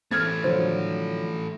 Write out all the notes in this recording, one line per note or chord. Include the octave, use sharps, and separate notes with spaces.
E3 A3 C4 F6 G#6 A6
D3 F3 F#3 C5